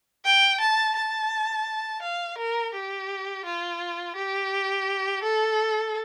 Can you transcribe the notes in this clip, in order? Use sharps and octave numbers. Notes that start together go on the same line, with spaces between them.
G5
A5
A5
F5
A#4
G4
F4
G4
A4